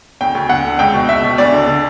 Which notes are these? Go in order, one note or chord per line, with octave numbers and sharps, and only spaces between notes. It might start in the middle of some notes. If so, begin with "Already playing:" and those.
D2 G5
D2
D2 F#5
D3
C#2 G5
B2
C#2 E5
B2
D2 D5
D3
D3